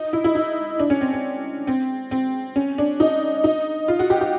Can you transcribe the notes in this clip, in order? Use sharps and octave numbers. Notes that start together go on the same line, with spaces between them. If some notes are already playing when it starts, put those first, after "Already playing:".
Already playing: D#4
E4
E4
D#4
D4
C#4
C4
C4
C4
C4
C#4
D4
D#4
D#4
F4
F#4
G4
G4